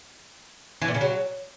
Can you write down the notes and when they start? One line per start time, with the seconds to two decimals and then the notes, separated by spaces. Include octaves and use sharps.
0.82 E3
0.88 A#2
0.94 C#3
1.01 F#3